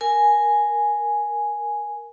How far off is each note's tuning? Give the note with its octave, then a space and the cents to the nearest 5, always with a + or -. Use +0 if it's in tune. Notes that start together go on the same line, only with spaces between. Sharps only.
A#4 -5 G#5 +0